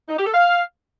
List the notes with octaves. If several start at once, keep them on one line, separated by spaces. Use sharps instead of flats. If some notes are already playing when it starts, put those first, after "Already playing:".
D#4
G4
A4
F5